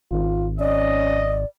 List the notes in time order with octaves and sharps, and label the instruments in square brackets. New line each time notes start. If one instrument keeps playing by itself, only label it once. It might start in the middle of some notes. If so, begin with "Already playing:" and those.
[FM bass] G#1 [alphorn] F4
[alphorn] C#4 [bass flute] D5 [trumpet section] D#5